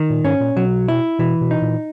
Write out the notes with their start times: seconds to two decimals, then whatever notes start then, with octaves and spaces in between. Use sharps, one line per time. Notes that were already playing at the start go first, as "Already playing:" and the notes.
Already playing: D#3
0.10 A#2
0.24 G#2 C#4
0.40 A#2
0.56 B2 F#3
0.88 E4
1.19 B2 E3
1.41 B2
1.51 D#4
1.62 A#2